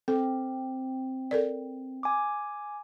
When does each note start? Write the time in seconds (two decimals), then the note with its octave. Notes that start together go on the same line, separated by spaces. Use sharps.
0.08 C4 A4
1.31 A4 A#4 D5
2.03 G#5 D6